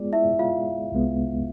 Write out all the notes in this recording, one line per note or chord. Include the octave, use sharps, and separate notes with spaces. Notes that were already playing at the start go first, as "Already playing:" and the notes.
Already playing: G#3 B3 F4 G#4 D5
E4 E5
F4 F5
C2 C3 G#3 B3